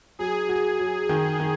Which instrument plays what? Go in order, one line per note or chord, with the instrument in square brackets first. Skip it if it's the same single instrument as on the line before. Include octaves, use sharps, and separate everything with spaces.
[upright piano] F#3 [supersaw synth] G#4
[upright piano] F#4
F#3
D#3
D#3